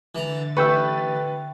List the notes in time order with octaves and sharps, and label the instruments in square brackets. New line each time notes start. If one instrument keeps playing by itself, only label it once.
[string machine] D3 A6 [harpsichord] E3 A#5
[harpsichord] A1 [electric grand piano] B4 [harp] E5 G5 C#6